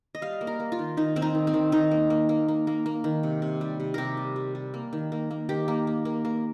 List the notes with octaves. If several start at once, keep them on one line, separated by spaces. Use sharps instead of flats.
D#5
G3 F5
A#3
A#4
A#3
F4
D#3
D#3 D#4
D#3 C4
D#4
D#3
C4
D#3
D#3 D#4
A#3
A#3
A#3
A#3
A#3
A#3
D#3
C3
C3
G3
C3
C3 G4 A#4
G3
G3
G3
A#3
D#3
A#3
A#3
D#3 G4
A#3
A#3
A#3
A#3